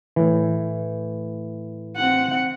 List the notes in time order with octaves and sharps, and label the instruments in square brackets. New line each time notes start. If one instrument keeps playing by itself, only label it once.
[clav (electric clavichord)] A2 E3
[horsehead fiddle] C4 F#5